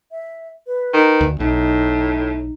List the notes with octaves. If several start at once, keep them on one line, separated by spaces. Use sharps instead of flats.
E5
B4
D#3
D2
B1 A2 D#4